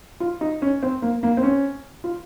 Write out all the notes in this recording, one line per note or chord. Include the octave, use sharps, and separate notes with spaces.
F4
D#4
C#4
C4
A#3
A#3
C4
C#4
F4